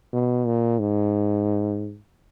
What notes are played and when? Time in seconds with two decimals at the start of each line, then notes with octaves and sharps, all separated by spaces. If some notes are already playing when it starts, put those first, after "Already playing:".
0.13 B2
0.46 A#2
0.79 G#2